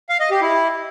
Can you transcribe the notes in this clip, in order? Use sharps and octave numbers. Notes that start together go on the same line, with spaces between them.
F5
D#5
G4
E4